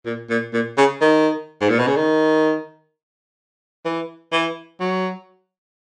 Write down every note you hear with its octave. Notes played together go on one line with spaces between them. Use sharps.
A#2
A#2
A#2
C#3
D#3
G#2
A#2
B2
C#3
D#3
E3
E3
F#3